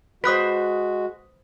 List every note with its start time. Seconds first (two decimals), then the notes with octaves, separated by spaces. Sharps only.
0.24 G#3 F#4 B4 C5 D#6 F#6 B6